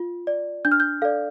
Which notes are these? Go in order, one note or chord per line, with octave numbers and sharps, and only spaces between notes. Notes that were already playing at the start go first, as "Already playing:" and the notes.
Already playing: F4
D5
D4 G6
F6
G6
A4 D5 F5